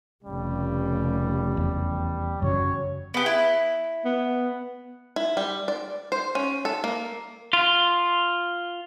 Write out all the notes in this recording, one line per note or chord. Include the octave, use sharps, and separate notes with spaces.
F1 C#3 G3
E2
F#2 C#3 F#3 C#5
B3 G4
E4
B3
E4
G3
D5
C5
C#4
A4
A#3
F4